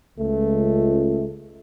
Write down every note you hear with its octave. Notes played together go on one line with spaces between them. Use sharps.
C#2 A3